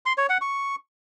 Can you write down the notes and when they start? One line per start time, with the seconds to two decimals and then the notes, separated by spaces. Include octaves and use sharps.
0.06 C6
0.18 C#5
0.29 F#5
0.41 C#6